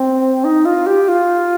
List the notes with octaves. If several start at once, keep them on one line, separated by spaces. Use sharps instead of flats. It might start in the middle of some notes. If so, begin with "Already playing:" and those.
Already playing: C4
D#4
F4
G4
F4